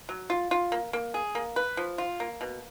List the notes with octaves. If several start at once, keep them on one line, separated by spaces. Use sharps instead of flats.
F#3
F4
F4
A#3
A#3
G#4
A#3
B4
F3
F4
A#3
B2